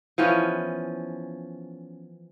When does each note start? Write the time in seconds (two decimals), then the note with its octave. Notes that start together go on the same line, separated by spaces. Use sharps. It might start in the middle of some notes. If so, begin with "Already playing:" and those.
0.18 E3 F3 B3 C#4